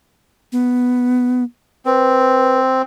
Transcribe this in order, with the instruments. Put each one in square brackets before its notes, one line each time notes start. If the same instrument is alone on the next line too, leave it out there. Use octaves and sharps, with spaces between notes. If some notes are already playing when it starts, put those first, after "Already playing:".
[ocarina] B3
[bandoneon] C4 [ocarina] B4